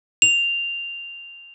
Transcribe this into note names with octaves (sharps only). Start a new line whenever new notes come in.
F7